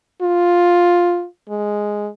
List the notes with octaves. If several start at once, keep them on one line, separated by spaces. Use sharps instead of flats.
F4
G#3